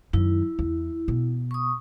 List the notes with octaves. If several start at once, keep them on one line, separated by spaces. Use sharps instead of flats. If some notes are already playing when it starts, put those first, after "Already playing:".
F#2 D#3 E4
E2
B2
C#6 D#6